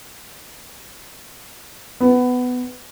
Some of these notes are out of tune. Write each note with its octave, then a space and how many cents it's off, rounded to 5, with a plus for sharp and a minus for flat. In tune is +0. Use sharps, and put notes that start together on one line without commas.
B3 +15